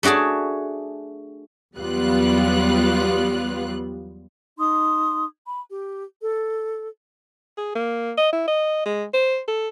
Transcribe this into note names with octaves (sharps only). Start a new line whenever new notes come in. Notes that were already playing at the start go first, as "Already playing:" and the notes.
A3 D4 F#4 G#4 A5
E2 F#3 G3 B3 F4 F#6
D#4 C6 D#6
B5
G4
A4
G#4
A#3
D#5
E4
D#5
G#3
C5
A4